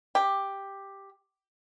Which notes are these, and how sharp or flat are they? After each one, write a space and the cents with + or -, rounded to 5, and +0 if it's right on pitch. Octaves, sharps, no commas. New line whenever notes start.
G4 +5